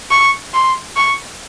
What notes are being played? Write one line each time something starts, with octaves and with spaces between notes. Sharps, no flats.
C#6
C6
C#6